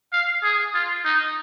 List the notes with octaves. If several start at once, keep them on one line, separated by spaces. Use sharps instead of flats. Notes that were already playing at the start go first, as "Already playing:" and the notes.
F5
G#4
F4
D#4